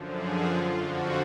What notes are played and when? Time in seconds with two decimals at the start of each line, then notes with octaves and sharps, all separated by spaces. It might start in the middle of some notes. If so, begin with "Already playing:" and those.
Already playing: F#2 D3 F3
0.15 G#4
0.46 F4
0.78 F2 D3 F3 F#4